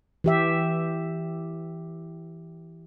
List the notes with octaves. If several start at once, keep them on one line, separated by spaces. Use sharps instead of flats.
E3 G4 E5